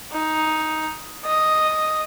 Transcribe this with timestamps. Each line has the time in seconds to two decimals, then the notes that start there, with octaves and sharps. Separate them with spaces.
0.13 D#4
1.25 D#5